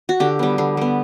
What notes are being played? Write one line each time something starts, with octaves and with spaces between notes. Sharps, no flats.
F#4
D3 G4
G3 B3
D3
G3 B3